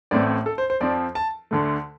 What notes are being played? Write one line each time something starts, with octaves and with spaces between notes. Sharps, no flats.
A1 A2 A3 C4 D5
A4
C5
C5
F2 F3 C4 D5
A5
D2 D3 A3